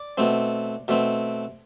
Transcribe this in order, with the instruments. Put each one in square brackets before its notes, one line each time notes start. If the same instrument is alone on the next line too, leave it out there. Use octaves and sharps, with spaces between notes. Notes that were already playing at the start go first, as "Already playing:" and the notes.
Already playing: [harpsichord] D5
B2 A3 C4
B2 A3 C4